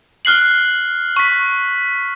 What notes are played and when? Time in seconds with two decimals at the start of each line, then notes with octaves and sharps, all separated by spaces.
0.25 F6 F#6 C7 F#7
1.17 C#6 B6